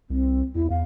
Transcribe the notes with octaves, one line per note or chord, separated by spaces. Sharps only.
C2 C4
E2 E4
E2 F5